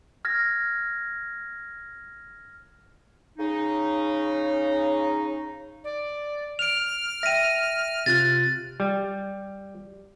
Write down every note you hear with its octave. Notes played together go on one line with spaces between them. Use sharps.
F6 G#6 A#6
C#3 D#4
D5
F6 D7 F7
E5 G5 A#6 D#7
C3 F4 F#6 A6
G3